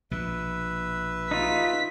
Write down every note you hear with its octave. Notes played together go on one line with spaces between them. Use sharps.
A#1 B2 B4 E5
D#4 F4 B6